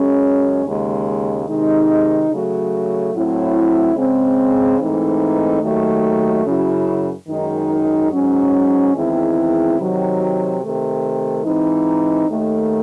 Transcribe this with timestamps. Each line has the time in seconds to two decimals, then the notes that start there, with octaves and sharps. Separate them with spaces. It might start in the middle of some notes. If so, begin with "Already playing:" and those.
Already playing: F#2 C#3 G#3 C#4
0.64 D#2 C#3 G#3
1.47 C3 D#3 G#3 D#4
2.30 C#3 F#3 A3
3.13 A2 F#3 C4 E4
3.96 C#3 G#3 C4
4.79 G#2 E3 A3 C4 D#4
5.62 D#2 D#3 F#3 A3
6.45 F#2 C#3 F#3 C#4 E4
7.29 F#2 D#3 G#3 D#4
8.12 G#2 F#3 C#4
8.95 E2 D#3 G#3 C4 E4
9.78 C3 D#3 F#3
10.61 C3 D#3 A3
11.44 G#2 E3 C4 D#4
12.28 D#2 D#3 A3